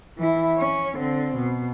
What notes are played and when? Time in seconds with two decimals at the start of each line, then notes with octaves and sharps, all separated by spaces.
0.18 E3 E4
0.57 C#4 C#5
0.98 D3 C4
1.36 B2